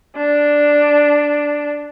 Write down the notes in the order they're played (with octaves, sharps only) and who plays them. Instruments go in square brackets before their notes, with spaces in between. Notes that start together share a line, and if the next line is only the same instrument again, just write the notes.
[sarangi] D4